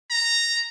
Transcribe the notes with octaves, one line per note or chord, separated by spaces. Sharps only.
A#5